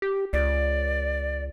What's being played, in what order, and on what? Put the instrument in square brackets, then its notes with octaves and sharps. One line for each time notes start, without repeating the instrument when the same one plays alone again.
[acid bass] G4
[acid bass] C#2 [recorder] D5